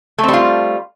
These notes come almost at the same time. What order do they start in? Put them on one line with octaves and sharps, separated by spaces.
A3 C4 G3 F4